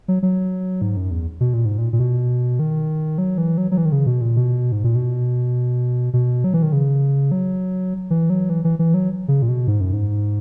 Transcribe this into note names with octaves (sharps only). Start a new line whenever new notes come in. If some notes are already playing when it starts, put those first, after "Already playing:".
F#3
F#3
G#2
F#2
E2
B2
A#2
G#2
A#2
A#2
B2
D#3
F#3
E3
F#3
F#3
E3
D#3
C#3
B2
A#2
B2
G#2
A#2
B2
B2
F#3
E3
D#3
C#3
F#3
E3
F#3
E3
E3
E3
F#3
C#3
A#2
B2
G#2
F#2
G#2